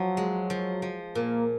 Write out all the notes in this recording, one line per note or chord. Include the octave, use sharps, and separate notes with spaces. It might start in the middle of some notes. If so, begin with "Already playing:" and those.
Already playing: F3 F#3
G#3
F3
F3
A#2 A#3